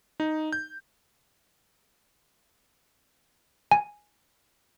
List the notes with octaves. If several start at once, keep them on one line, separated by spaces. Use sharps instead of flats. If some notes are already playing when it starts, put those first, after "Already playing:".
D#4
G6
G#5